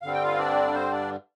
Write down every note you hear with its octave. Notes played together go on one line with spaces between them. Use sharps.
G2 D3 G3 C4 F5
G5
F4 F5
D4 D5
C4 C5
D4 D5